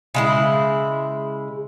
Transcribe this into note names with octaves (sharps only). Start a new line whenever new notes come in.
C#3 G#3 E4